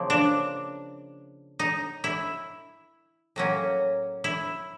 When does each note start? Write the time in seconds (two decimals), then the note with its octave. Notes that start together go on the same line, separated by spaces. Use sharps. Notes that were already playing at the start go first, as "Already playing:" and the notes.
Already playing: C#3 F3 A#3
0.10 D4
1.59 D#4
2.04 E4
3.36 A2 F#3 A#3 C#4
4.24 E4